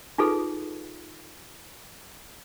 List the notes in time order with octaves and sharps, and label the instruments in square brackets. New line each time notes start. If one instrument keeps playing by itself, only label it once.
[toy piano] D#4 F4 G#4 A4 B4